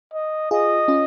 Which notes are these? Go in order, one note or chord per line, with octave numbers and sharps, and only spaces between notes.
D#5
F4 G#4 D#5
C#4 F4